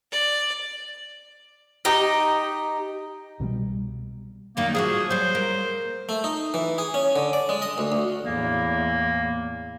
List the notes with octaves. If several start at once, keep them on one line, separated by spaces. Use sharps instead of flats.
D5
D#4 G4 D#5
C2 B2 D3 G3
F#2 D#3 G3 A#3
F3 E4 F#4 G#4
F#3 G3 C5
A#3
A3
D#4
E3
G#4
C#4
D3
D5
G#3
D#5
D2
D2
E2 A2 A#3